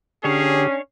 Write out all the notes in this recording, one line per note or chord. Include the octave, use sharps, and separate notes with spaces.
D3 C#4 D4 G4 G#4 C#5 F5